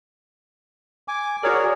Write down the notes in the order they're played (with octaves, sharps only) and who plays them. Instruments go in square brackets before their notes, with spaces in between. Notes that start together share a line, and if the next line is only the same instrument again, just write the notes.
[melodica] G#5 D6
[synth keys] F#4 C#5 D5 [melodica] G#4 A#4